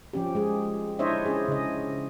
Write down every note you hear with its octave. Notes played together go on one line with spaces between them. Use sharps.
F3 C#4 G4
G#3 G#4
D4 E4 C5 C#5 D#5 E5
C#4 G#4
C#3 D#5